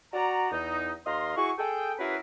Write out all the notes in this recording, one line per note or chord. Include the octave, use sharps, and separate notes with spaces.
F#4 D5 A#5
E2 D#4
D#2 D#5 F5 A#5 C6
E4 F#4 G#4 C#6
G#4 A4 G5
C#4 E4 F#4 G#4 A#4 B4